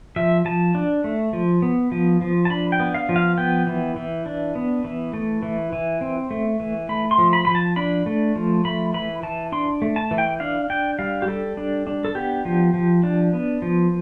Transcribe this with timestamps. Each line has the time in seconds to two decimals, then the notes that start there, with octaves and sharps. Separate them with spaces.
0.16 F3 E5
0.45 F3 A5
0.75 D4
1.04 A3
1.33 F3
1.62 B3
1.92 F3
2.21 F3
2.45 A5
2.50 D4 B5
2.72 G5
2.80 B3
2.94 F5
3.09 F3
3.16 F5
3.38 B3 G5
3.67 E3
3.96 E3
4.26 D4
4.55 B3
4.84 E3
5.13 A3
5.43 E3
5.73 E3
6.01 C4
6.31 A3
6.60 E3
6.89 A3 B5
7.11 C6
7.18 F3
7.33 B5
7.45 F3 B5
7.55 A5
7.76 D4 B5
8.06 A3
8.36 F3
8.65 A3 B5
8.94 E3 B5
9.23 E3 A5
9.52 D4 C6
9.82 A3
9.96 A5
10.11 E3
10.18 G5
10.40 D4 F5
10.70 D4 G5
10.99 G3 F5
11.22 G4
11.28 G3 A4
11.57 D4
11.87 D4
12.05 A4
12.15 B3 G4
12.45 F3
12.74 F3
13.03 D4
13.33 B3
13.62 F3